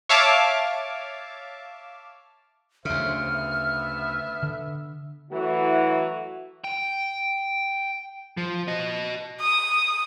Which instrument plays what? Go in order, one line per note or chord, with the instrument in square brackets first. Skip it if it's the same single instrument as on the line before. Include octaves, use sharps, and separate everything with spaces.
[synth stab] C#5 E5 F5 A5 D6
[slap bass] D2 C#3 [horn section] C5 E5 [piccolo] F6
[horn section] B3 E5
[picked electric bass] D3
[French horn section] E3 F#3 A3 E4 F#4
[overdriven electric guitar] G5
F3
F#4 D#5
[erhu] D#6